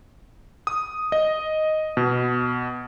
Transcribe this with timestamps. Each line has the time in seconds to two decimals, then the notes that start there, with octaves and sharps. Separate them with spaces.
0.67 D#6
1.12 D#5
1.97 B2